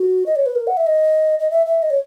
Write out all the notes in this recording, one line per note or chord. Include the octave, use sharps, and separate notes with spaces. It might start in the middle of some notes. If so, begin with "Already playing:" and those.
Already playing: F#4
D#5
C#5
B4
A#4
F#5
E5
D#5
D#5
E5
E5
D#5
C#5